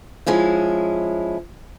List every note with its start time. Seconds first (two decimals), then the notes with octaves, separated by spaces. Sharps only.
0.26 F3 G#3 C#4 E4